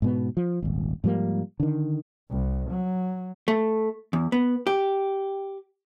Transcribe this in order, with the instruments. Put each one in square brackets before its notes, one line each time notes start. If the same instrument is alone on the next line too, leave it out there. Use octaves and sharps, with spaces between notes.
[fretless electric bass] G#2 B2 B3
F3
D#1 G#1
G#2 F3 G3 A#3
D3 D#3
[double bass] C2
F#3
[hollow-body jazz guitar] A3
E2
B3
G4